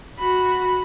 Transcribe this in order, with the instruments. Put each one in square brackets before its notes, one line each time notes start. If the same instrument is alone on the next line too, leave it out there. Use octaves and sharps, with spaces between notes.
[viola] F#4 B5